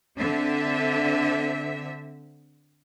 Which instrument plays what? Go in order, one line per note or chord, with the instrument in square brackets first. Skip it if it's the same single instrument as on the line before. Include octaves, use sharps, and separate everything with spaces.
[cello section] D3 C4 E5